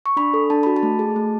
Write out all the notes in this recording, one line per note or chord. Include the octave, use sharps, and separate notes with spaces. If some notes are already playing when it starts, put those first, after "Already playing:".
C#6
D4 B5
A4
D4 A5
F#4 B5
A5
A3
G#4
A3